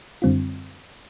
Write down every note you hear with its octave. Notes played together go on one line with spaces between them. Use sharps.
F#2 D3 G3 C4 F4